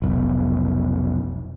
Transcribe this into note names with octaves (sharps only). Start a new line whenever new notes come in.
F1 B1